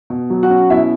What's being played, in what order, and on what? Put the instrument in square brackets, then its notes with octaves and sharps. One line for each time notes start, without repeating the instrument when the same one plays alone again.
[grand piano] B2
F#3
F#4 F#5
C#4
B2 E4 E5